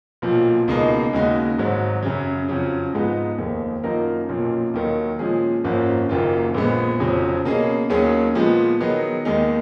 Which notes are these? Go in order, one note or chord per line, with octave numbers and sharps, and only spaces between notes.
B1 A#2 F3
C#2 B2 A#3 D#4 G#4
D#2 C#3 G#3 D#4 F#4
G#1 G#2 F#3
F#2 C#3 F#3
F2 C#3 F#3
G#2 F3 G#3 B3 D#4
F1 D#2 D#3
F#2 F3 A#3 D#4 A#4
B1 A#2 F3 A#3 C#4
D#2 D#3 F#3
A#2 F3 G#3 C#4 G#4
G#1 F#2 F3 A#3 C#4
F#1 F#2 D#3 A#3 F4
A#1 A#2 G#3 B3
F1 F2 C#3 F#3
B2 A#3 C#4 G#4 D#5
D#2 D#3 F#3 C#4 G#4
A#2 F3 G#3 B3
D#3 F#3 B3 D#4 G#4
D#2 D#3 G#3 D#4 G#4